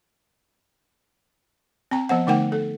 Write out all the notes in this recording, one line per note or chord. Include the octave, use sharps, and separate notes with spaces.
C4 G5 A#5
F3 B3 C5 F#5
D3 A3 D#4 A#4 F#5 G5
A4